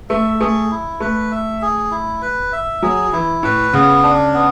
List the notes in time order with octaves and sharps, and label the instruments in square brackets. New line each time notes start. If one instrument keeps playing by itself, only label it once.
[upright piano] A3 [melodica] E5
[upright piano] A3 [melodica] G#4
[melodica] E4
[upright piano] A3 [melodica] B4
[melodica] E5
G#4
E4
B4
E5
[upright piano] F#3 [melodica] G#4
[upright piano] E3 [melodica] E4
[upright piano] A2 [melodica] B4
[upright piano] C#3 [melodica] B3
[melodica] D4
B3